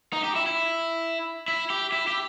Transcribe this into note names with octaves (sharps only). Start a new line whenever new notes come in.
D#4
G4
E4
E4
E4
G4
E4
G4